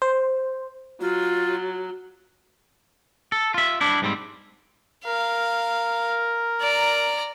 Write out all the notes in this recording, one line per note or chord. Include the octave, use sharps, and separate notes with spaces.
C5
F#3 F4
A4
F4 E5
G3 D4 E4
G#2 G3 C4
A#4 F5
D5 A#5